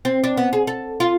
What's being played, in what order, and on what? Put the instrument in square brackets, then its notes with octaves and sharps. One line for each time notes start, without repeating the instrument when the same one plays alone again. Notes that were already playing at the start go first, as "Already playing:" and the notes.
[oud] C4
D4
B3
G#4
A4
F4